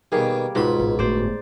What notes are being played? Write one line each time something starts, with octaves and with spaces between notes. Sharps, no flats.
B2 D#3 G3 A#3 G#4
C#2 G#2 B2 F4 B5
A1
G1 A2 F#4 C5 D5